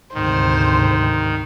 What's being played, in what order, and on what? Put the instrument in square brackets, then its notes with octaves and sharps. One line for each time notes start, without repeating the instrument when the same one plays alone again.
[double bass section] D2 G#2 C3 [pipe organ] D#3 [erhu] C5